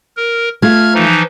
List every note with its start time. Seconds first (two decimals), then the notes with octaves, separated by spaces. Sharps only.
0.17 A#4
0.62 A3 F4 F6 G#6
0.95 E3 F3 D#4